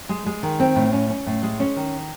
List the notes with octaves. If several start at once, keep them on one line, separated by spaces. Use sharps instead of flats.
G#3
G#3
D#3
C4
A2
C#4
C#4
A2
G#3
C#4
D#3